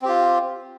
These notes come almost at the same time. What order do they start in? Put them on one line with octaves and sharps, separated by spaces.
C4 G4 F4